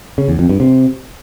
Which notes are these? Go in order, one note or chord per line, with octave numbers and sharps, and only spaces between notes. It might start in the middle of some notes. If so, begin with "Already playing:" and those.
C#3
E2
F2
G2
C3